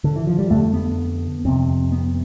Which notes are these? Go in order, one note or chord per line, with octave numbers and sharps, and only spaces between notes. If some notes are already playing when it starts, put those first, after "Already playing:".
D3
E3
F3
G3
F2 D3 A3
B3
F2 C3 C4
B3